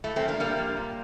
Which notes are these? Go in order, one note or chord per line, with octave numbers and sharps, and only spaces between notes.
A2 A3
A3 C4
F3
A#3 D4
A2 G3 A#3
F3
A#2